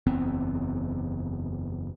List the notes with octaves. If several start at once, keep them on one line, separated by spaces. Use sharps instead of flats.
F#1 E2 B3 C4